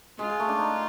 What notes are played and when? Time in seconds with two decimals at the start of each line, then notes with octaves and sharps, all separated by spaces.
0.19 G#3 F4
0.30 G#3
0.40 A3
0.49 D4
0.59 D#4